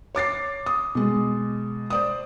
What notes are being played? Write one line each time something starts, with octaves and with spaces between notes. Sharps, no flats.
C#5 D6 A6 C7
D#6
B2 G#3
C5 D5 D#6